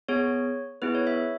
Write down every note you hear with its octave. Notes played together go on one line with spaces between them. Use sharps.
B3 G#4 C#5
B3 E4 G#4 B4
C#5
E5